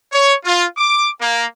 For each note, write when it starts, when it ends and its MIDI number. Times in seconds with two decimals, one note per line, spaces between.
0.12 0.33 73
0.43 0.63 65
0.76 1.08 86
1.20 1.45 58